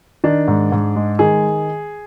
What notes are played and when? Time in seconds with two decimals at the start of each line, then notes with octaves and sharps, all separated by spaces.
0.24 D#3 D4
0.48 G#2
0.72 G#2
0.96 G#3
1.19 D#3 G#4